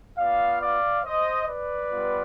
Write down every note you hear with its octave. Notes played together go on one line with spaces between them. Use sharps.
B3 F4 D5 F5
D5 F5
C5 D#5
B4 D5
G3 B3 F4